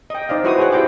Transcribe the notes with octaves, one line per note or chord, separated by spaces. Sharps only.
D#5 G5
D#4 C5 D5 F5
E4 F#4 B4 C5 C#6 D#6
G#4 C5 C#5 F#5 G5
E4 G4 C5 D5 G5 D6